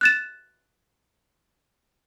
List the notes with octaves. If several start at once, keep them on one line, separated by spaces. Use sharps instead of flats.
F#6 A6 E7